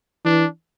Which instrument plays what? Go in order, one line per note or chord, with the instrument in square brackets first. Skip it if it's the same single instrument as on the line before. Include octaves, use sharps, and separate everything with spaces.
[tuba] E3 [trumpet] D4